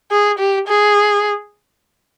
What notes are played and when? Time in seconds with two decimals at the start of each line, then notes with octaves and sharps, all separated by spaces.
0.11 G#4
0.38 G4
0.67 G#4